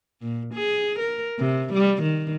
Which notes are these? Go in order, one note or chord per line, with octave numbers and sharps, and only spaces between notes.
A#2
G#4
A#4
C3
G3
D#3